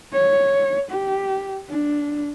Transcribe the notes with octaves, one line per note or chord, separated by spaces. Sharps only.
C#5
G4
D4